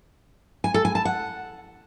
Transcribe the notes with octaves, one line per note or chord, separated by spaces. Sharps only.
G#5
A4
G#5
A5
F#5